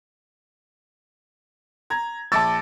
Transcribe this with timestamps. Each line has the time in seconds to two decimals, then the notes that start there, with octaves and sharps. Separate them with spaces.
1.90 A#5 G#6
2.32 A#1 A5 D6 E6 A6